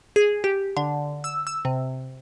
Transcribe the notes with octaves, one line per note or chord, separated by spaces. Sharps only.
G#4
G4
D3
E6
E6
C3